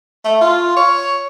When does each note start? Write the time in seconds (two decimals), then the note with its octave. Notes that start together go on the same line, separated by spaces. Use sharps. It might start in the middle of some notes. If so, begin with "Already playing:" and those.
0.24 A3
0.41 F4
0.76 C#5